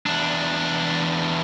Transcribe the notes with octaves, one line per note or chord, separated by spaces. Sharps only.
E2 D4